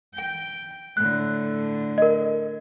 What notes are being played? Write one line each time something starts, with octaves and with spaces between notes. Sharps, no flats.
G5
A2 D3 F#6
A#4 D#5